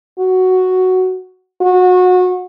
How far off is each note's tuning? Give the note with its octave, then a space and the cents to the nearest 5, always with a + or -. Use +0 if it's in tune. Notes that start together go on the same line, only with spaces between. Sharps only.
F#4 +5
F#4 -25